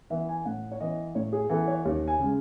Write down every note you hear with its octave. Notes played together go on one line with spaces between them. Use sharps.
E3 B3 E5
G#5
A2 F#5
C#5
E3 B3 D#5
A2 C#5
G#4
E3 B3 A4
C#5
D#2
G#5
C#3 G#3